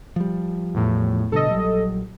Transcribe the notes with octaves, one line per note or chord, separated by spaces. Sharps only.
F3 G3
E2 A2
G2 B2 D3 A4 D#5
A#1 F#3 G3